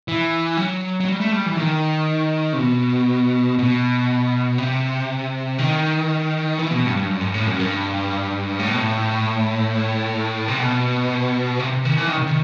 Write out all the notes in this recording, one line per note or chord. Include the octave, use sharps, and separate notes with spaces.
E3
F#3
F#3
G3
A3
G3
E3
D#3
C3
B2
B2
C3
D#3
E3
B2
G2
G2
F#2
G2
A2
F#2
G2
A2
B2
A2
C3
B2
C3
C3
D#3
E3
D#3
C3
D#3